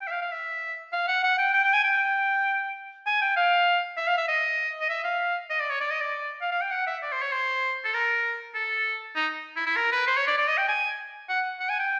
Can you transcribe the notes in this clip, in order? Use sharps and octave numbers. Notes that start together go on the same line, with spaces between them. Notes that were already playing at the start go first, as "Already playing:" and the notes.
G5
E5
F5
F5
E5
F5
F#5
F#5
G5
G5
G5
G#5
G5
G#5
G5
F5
E5
F5
E5
D#5
D#5
E5
F5
D#5
D5
C#5
D5
D#5
D5
F5
F5
G5
F#5
E5
D5
C5
C#5
C5
A4
A#4
A4
D#4
E4
E4
A#4
B4
C5
C#5
D5
D5
D#5
G5
G#5
F#5
F#5
G#5
G5